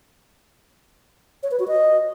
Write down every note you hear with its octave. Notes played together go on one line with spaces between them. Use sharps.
C#5
B4
F#4
D#5